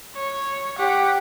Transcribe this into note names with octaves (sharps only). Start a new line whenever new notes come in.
C#5
G4 F#5